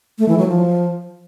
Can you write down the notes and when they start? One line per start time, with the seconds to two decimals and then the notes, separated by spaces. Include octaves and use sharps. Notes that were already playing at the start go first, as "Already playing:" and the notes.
0.19 A3
0.28 E3
0.38 F#3
0.48 F3